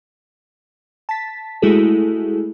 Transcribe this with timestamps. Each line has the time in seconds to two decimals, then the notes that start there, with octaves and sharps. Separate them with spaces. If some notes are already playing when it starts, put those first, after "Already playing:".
1.09 A5 A6 B6
1.62 G#3 A3 E4 F#4 G#4 A4